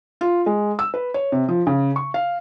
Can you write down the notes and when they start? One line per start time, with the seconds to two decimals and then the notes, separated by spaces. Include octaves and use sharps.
0.21 F4
0.46 G#3
0.79 E6
0.94 B4
1.14 C#5
1.32 C3
1.48 F3
1.67 C#3
1.96 C#6
2.14 F5